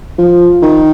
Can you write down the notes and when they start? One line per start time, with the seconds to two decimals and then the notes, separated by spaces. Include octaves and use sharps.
0.18 F3
0.62 D#3